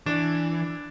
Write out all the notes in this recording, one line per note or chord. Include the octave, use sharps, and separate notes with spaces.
E3 D4